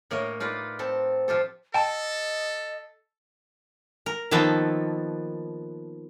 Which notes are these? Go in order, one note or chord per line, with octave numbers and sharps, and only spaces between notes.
A2 A#3 C#5 D#5
D#4 F4 B4 D5
C4 A4
F3 F4 G4 A4
A4 D#5 G5 A5
A#4
D#3 F3 A#3 B3 A4